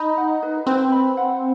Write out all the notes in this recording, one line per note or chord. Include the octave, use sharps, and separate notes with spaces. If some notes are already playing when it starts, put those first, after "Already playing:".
Already playing: D#4 B5
F#5
B4
C4 B4
B5
F#5